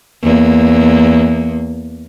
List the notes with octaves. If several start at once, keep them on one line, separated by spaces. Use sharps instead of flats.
E2 A#3